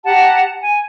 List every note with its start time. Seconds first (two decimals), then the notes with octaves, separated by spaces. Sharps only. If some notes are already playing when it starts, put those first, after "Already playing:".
0.05 G4 F#5 A5 A#5
0.61 G#5